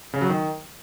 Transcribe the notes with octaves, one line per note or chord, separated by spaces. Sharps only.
C#3
F#3
D#3